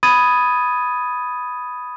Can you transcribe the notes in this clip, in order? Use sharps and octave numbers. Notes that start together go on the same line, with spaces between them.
B5 D#6 G#6 A6 D#7